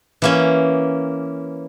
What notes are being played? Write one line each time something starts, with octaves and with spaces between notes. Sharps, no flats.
E3 A#3 C#4